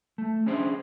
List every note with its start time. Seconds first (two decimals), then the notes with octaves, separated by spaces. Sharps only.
0.18 A3
0.46 C#4 D4 G#4 C5